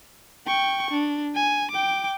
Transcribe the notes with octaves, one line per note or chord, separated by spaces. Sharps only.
G5 C#6
D4
G#5
G5 D6